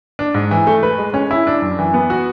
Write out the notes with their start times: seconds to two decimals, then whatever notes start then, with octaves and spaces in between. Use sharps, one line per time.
0.19 D4
0.34 G#2
0.51 E3
0.67 A3
0.83 B4
0.98 G#3
1.14 C#4
1.31 E4
1.47 D4
1.62 F#2
1.79 E3
1.94 B3
2.10 F#4